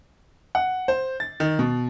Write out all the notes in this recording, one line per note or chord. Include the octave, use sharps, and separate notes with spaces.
F#5
C5
A6
D#3
B2